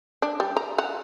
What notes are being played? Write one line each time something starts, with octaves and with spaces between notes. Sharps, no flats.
D4
G3
A#5
F#5 A#5